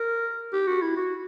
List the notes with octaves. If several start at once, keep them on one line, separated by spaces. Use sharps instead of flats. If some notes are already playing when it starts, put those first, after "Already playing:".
Already playing: A#4
G4
F#4
E4
F#4